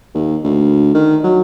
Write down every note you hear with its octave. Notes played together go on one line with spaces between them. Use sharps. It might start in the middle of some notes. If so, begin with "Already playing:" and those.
D#2
D2
D#3
F#3